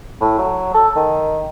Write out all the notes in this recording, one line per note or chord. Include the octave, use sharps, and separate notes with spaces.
A2
F#3
A4
D#3